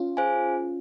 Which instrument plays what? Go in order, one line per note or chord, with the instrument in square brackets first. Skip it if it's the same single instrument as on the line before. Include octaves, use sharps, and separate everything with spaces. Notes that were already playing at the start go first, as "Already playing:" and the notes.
Already playing: [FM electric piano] C#4 F4
[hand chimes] G#4 C5 F5 G#5